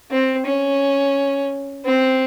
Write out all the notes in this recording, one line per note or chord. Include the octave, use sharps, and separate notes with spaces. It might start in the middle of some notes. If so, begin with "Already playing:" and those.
C4
C#4
C4